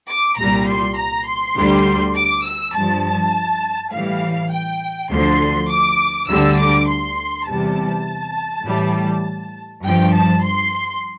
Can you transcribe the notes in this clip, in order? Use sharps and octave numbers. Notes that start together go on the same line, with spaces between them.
D6
C2 A#2 G3 A#5
C6
A#5
C6
D2 D3 G3
D6
E6
G2 F3 A5
A2 E3 G3 F5
G5
D2 D3 F3 C6
D6
D2 D3 G3 E6
D6
C6
E2 C3 G3 A5
A2 E3 G3
G2 F3 G5
A5
C6